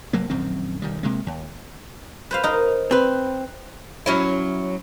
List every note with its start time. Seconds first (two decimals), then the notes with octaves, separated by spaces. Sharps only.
0.13 F1 F#3 A#3
0.30 A#1 F#2 D#3 C4
0.82 B1 D#3 G3
1.03 C3 G#3 A#3
1.27 D#2
2.31 B4 C5 F5
2.44 D#4 A#4
2.91 C4 B4
4.06 F#3 C#4 E4